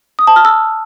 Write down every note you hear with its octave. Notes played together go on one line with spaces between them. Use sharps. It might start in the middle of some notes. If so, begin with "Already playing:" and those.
D#6
A5
F6
E6